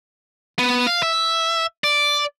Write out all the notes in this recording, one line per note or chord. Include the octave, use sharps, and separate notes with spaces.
B3
F5
E5
D5